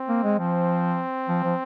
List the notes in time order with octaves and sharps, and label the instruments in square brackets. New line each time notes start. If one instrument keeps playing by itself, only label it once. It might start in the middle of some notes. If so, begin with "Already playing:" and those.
Already playing: [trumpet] C4
[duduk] A#3
G#3
[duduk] F3 [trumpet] C4
[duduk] F3
F3